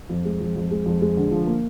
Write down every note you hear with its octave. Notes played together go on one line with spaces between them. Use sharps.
F2
G#3
F2
F2
G#3
F2
G#3
D3
F3
A#3